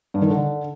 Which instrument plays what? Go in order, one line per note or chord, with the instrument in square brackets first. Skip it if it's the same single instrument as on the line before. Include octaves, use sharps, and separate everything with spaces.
[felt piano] G2
D#3
D3